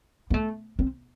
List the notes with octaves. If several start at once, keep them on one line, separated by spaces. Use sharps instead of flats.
B3
A3
C4